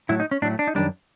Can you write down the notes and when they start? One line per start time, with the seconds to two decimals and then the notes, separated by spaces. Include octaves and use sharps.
0.09 A2 F#3 A3 E4
0.20 D#4
0.31 C#4
0.42 A2 F#3 A3 D4
0.59 D4
0.67 D#4
0.75 F#2 D#3 G3 D4